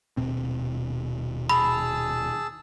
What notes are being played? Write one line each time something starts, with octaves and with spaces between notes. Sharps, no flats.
D#1 B2 C4
G#4 A5 B5 E6